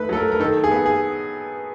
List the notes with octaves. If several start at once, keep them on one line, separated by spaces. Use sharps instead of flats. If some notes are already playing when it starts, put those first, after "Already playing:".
Already playing: D#3 A3 B4
F#3 A4
A#4
A#4
D#3 A4
G#4
B3
G#4